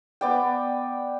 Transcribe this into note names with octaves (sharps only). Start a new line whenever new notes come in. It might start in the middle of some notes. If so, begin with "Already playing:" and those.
B3 D5 G5